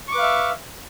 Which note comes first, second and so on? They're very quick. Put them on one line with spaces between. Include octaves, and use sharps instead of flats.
C#6 D6 B4 F5 E5